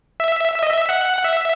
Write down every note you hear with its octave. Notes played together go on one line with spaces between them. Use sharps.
E5
E5
D#5
E5
F#5
F#5
E5